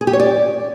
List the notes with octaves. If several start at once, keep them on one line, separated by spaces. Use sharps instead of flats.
G#4
G4
C#5
D5